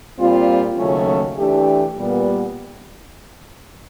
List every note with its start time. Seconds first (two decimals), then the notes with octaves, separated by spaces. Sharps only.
0.17 A#2 G3 C4 F4
0.76 D#2 C#3 F#3 A3 C#4
1.36 E3 A3 D4 G4
1.95 A#2 G3 B3